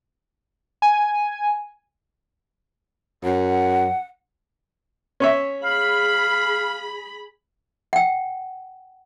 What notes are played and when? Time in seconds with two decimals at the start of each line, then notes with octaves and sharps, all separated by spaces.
0.82 G#5
3.24 F#2 F#5
5.20 C#4 C#5 E5
5.64 G#4 F5 B5
7.93 F#5 G5